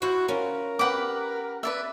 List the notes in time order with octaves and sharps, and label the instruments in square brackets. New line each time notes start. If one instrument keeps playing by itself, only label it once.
[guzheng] E4 C5 F#5 [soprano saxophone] F#4
[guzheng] C#4 F4 [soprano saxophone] A#4
[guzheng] G4 B5 [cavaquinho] B4 F#5 D6
[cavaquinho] B4 D5 E5